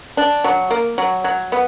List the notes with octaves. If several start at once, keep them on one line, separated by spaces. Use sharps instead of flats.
D4
F#3
A#3
F#3
F#3
B3